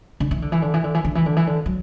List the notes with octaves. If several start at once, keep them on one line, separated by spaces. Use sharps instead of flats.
D3
E3
D3
E3
D3
E3
D3
E3
D3
E3
D3
E3
D3
F#3